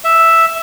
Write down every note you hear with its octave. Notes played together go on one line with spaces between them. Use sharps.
E5